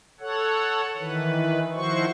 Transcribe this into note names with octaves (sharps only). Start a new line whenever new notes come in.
A4 C#5 F#5
D#3 E3 B4
D#3 F3 E4 F#4 C5 C#6